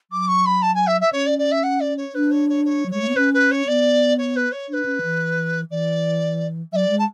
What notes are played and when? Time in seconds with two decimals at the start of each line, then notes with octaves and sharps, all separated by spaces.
0.11 F#3 D6
0.28 C#6
0.45 B5
0.62 A5
0.74 G#5
0.86 E5
1.00 E5
1.12 C#4 C#5
1.26 D5
1.38 D5
1.51 E5
1.63 F#5
1.80 D5
1.97 C#5
2.14 D4 B4
2.31 C#5
2.49 C#5
2.65 C#5
2.86 F#3
2.91 G#3 C#5
3.01 A3
3.09 B3
3.16 C#4 B4
3.33 B4
3.51 C#5
3.67 B3 D5
4.18 C#5
4.36 B4
4.51 C#5
4.69 D4 C#5
4.73 B4
4.85 C#4
5.03 E3
5.70 E3 D5
6.72 F#3 D5 E5
6.90 G#3
6.98 A5